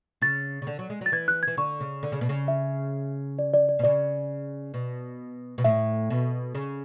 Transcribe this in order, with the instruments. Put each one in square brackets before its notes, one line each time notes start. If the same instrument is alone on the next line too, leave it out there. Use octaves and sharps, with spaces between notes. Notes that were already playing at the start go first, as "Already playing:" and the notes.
[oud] C#3 [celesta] A6
[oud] C#3
D3
F#3
G#3
[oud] F#3 [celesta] A6
[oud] E3 [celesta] G#6
[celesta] F#6
[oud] E3 [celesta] G#6
[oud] D3 [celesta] C#6
[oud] C#3
D3
C#3
B2
C#3
[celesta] E5
D5
D5
D5
[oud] B2
[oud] C#3 [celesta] D5
[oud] B2
B2
[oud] A2 [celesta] E5
[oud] B2
C#3